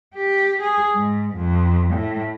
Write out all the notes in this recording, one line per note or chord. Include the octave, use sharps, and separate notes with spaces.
G4
G#4
G#2
F2
A2